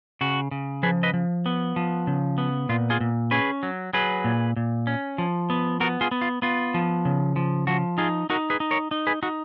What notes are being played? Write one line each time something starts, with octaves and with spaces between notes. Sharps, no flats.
C#3 F#4
C#3
F3 G#4 B4
B4 D#5
F3
B3
F3
C#3
B3
A#2 F4
F4 G#4
A#2
C#4 G#4 B4
F#3
F#3 G#4 B4
A#2
A#2
C#4
F3
B3
B3 F#4 A#4
F4 G#4
B3
F4
B3 F4
F3
C#3
F3
F3 F#4
D#4 F4 G#4
D#4 F#4 A#4
G#4 B4
D#4
A#4 C#5
D#4
G#4 B4
D#4 F#4